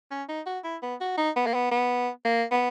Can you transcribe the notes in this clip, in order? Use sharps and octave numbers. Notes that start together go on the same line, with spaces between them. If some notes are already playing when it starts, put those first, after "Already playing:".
C#4
D#4
F#4
E4
B3
F#4
D#4
B3
A#3
B3
B3
A#3
B3